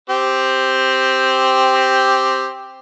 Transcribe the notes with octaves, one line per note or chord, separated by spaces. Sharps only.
C4 G4